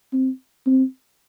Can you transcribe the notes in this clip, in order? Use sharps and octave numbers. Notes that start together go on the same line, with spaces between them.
C4
C4